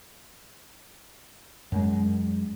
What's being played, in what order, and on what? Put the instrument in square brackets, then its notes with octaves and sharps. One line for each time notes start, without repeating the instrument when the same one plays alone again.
[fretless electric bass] F#2 G#3